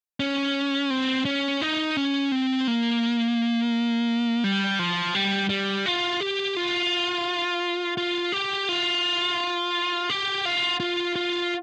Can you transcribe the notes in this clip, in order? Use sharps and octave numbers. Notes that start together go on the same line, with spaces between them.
C#4
C4
C#4
D#4
C#4
C4
A#3
G3
F3
G3
G3
F4
G4
F4
F4
G4
F4
G4
F4
F4
F4